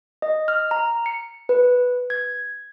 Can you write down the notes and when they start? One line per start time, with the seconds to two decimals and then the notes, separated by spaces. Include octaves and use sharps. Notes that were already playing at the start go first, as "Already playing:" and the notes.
0.22 D#5
0.48 F6
0.71 A#5
1.06 C#7
1.49 B4
2.10 G#6